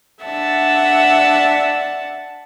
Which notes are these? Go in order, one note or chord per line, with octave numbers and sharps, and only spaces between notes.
D4 E5 F#5 A5